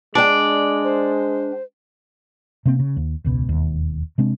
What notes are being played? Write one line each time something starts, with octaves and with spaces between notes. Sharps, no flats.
G#3 D4 D5 G5
C5
C3 A#3 C4
C#3
D#2
E1 C#2 B2
E1 D#2
C3 G#3 C4 D4